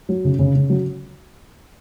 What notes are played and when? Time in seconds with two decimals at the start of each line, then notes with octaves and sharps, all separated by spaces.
0.09 F#3
0.25 C#3
0.39 C#3
0.55 C#3
0.70 F#3